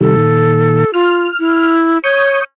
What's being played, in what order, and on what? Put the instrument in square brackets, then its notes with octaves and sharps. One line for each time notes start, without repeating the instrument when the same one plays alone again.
[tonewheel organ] C3 D#3 G3 [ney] A4
[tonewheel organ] A#2 D#3
[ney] F4 [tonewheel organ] F6
[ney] E4
[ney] C#5 [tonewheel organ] C#6 D#6 G6